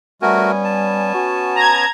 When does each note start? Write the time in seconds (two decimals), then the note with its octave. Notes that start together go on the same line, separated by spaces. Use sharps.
0.22 G3 A3 B3 C#4 F#4 A#4 G#5
0.64 A5
1.14 F#4
1.56 A#5 G#6